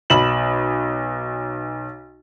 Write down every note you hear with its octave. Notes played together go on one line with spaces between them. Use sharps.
B1 B5 E7 F#7